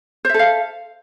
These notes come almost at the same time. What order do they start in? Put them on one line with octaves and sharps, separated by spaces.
C5 E5 A4 F5